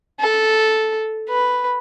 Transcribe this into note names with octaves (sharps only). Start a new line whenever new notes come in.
A4
B4